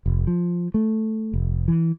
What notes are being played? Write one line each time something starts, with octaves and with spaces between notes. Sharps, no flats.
F1
F3
A3
F1
E3